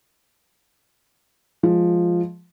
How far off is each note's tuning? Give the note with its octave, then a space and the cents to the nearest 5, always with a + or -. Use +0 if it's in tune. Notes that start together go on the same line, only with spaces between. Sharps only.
F3 +0 G#3 +0